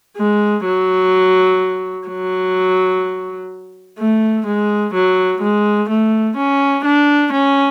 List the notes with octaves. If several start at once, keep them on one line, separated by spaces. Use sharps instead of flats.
G#3
F#3
F#3
A3
G#3
F#3
G#3
A3
C#4
D4
C#4